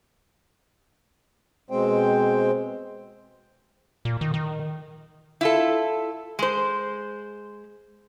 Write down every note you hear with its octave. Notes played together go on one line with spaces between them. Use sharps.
B2 G#3 C4 C5 G5
A#2
D#3
D#3
E4 F4 A4
G#3 C5